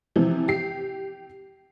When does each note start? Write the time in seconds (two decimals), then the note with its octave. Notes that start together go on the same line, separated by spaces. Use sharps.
0.16 C3 E3 F3
0.48 G4 C7